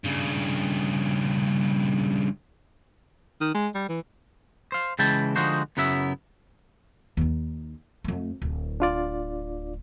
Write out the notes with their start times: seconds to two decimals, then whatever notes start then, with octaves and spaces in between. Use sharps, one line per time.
0.04 G2 C#3
3.41 D#3
3.54 G#3
3.75 G3
3.89 E3
4.72 C5 F5
4.99 C#3 E3 G#3 G5 A5 B5
5.36 D3 F3 G#3 D#4 F#4 C5
5.77 F#2 C#3 F#3 B3 E4 E5
7.17 D#2 D#4
8.04 F2 A3
8.42 D1
8.80 D4 F4 D5